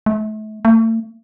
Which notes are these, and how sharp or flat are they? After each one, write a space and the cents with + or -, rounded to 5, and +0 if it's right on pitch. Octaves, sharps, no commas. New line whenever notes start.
A3 -35
A3 +40